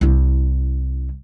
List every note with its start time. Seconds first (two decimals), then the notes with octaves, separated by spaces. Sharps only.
0.01 C2 E4